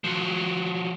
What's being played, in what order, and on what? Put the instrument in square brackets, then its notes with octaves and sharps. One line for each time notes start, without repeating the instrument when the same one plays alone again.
[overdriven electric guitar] F3 F#3